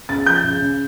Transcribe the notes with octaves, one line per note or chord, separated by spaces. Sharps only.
C#2 A6
F3 G6
C#2
C#3